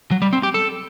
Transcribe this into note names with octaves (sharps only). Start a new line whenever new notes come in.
F#3
G3
C4
G4
A4